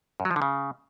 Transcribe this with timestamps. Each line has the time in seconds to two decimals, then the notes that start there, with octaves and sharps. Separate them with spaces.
0.20 F#2
0.25 F#3
0.31 F3
0.36 D3
0.42 C#3